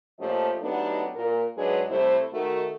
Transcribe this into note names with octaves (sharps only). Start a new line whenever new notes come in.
A#2 F3 A3 C#4 G4 D#5
F#3 A3 B3 D4 D#4 G4
A#2 A#4
G#2 F#3 G#3 D4 G#4 B4
C3 G3 A3 E4 C5
D#3 A3 F#4